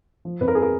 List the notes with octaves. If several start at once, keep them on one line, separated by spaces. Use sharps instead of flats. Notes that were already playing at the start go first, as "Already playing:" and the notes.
F3
F2 B4
A#4
G#4
A#4